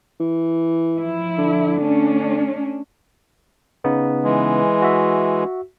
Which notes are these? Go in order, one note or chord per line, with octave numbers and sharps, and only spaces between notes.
E3
F3 E4
D3
A3 C#4 D4
C#3 B3 D#4
E3 G#3
F#4 E5